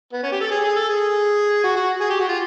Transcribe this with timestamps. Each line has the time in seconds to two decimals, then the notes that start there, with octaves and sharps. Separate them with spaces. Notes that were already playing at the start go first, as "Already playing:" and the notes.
0.13 B3
0.23 C#4
0.32 G4
0.41 A4
0.51 G#4
0.64 G#4
0.76 A4
0.89 G#4
1.64 F#4
1.76 F#4
2.01 G#4
2.10 G4
2.20 F#4
2.28 F4